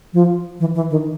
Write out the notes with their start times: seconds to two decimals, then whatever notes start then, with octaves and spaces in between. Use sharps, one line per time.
0.14 F3
0.60 E3
0.75 E3
0.90 D#3